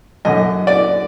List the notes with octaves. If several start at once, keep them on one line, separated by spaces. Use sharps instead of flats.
F#2 D3 D#5
D5